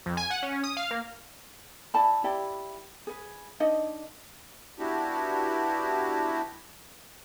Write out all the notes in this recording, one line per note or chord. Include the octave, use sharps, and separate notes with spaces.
F2
G#5
F#5
C#4
D#6
F5
A#3
E4 D5 A5 B5
E4 G4 D5 B5
G#4 B4
D4 D#4 D#5
B3 D4 E4 F#4 G4